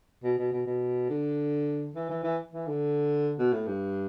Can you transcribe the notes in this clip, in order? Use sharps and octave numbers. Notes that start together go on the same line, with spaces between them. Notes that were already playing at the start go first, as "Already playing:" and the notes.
B2
B2
B2
B2
D3
E3
E3
E3
E3
D3
B2
A2
G2